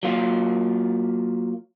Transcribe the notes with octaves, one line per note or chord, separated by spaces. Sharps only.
F#3 A#3 F4